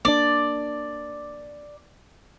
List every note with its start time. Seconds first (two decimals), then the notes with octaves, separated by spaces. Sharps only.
0.05 A#3 C#4 D4 D5